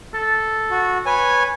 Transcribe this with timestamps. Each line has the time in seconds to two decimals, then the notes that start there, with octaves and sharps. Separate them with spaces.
0.14 A4
0.71 F#4
1.06 B4 C#5 G#5